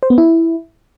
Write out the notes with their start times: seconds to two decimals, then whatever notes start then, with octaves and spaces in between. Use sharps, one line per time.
0.03 C5
0.10 B3
0.18 E4